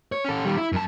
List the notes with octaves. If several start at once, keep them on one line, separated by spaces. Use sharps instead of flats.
C#5
C#4 A4
D#3 G3
E4
F#2 A5